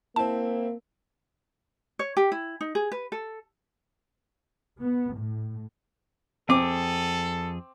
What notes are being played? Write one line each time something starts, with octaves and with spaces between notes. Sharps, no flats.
A#3 C4 E4 A5
C#5
G4
E4
D#4
G#4
B4
A4
B3
A2
F2 C4 G#4 A4 D6